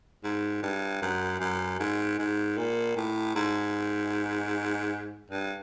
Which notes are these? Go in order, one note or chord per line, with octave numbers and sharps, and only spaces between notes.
G#2
G2
F#2
F#2
G#2
G#2
A#2
A2
G#2
G2